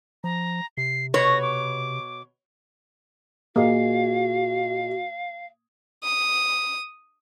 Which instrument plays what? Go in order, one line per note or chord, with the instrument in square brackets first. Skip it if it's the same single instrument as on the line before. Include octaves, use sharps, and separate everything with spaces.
[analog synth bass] F3 [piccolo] A#5
[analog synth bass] C3 [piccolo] C7
[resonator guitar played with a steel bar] B2 B4 C#5 [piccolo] A#6
[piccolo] D6
[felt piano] A#2 G#4 D#5 [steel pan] A#3 [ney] F#4 [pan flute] F5
[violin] D#6